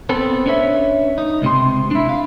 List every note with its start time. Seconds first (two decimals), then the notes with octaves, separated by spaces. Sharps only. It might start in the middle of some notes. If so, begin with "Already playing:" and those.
0.09 B3 C4 A4
0.46 C#4 D4 B4 C#5 E5
1.18 D#4
1.42 C#2 C3 C6
1.91 D4 E4
2.09 F5